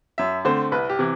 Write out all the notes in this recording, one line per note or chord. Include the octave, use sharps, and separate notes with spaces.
F#2 E5
D3 A3 C4 C5
C2 B4
G4
C3 E3